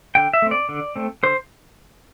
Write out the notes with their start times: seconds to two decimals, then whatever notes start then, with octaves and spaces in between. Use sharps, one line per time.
0.15 D3 G5
0.33 E5
0.42 A3 C4
0.51 D5
0.69 D3
0.96 A3 C4
1.23 D3 C5